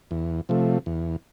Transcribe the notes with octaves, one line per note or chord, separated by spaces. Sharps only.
E2
C3 F3 A3
E2